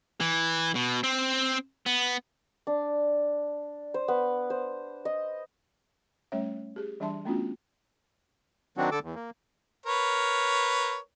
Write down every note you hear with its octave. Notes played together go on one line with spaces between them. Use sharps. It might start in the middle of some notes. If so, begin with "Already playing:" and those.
E3
B2
C4
B3
D4
C5
B3
C5
D#5
G3 A3 C#4 C#5 E5
G4 G#4
E3 G3 D4 E5 A5 C6
A3 B3 C#4 D4 F4 F#4
D#3 F#3 C4 D4 F#4
D3 A4 D6 E6
E2
A#3
A#4 B4 C#5